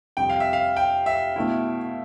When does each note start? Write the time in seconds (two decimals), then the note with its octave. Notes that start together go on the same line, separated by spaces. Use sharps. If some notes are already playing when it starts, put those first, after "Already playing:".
0.17 F2 C3 G3 G5
0.29 F5
0.40 E5
0.53 F5
0.76 G5
1.06 E5
1.36 B2 A3 E4